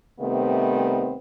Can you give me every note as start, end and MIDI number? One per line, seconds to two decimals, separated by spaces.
0.20 1.16 48
0.20 1.16 51
0.20 1.16 55
0.20 1.16 57
0.20 1.16 59
0.20 1.16 60